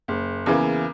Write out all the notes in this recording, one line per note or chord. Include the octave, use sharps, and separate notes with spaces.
F#1
E2 C#3 E3 A#3